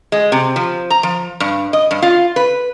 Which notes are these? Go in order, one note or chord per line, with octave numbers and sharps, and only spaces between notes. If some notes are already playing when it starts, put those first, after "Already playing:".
G#3
C3
F3
A#5
F3
G2
D#5
G2
F4
B4